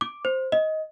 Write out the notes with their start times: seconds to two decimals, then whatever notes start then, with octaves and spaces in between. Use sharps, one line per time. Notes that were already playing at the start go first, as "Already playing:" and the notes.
0.01 D6
0.25 C5
0.52 D#5